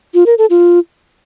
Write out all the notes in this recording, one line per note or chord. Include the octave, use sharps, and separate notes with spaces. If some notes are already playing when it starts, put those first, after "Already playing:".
F4
A#4
A4
F4